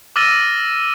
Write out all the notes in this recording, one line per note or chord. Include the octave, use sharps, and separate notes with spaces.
D6 E6 F6 A6 A#6 D#7